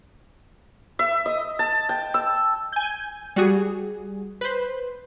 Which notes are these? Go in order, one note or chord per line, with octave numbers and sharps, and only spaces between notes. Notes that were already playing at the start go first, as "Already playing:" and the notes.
E5
D#5
A5
G5
E6
G#5 G6
G3 F#4 G#4
B4 C5